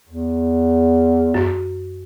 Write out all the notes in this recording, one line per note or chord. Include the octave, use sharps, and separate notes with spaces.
E2
F#2